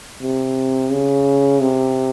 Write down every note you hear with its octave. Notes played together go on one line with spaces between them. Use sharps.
C3
C#3
C3